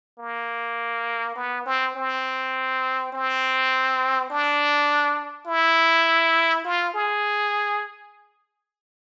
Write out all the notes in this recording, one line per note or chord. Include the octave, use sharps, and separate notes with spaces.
A#3
B3
C4
C4
C4
D4
E4
F4
G#4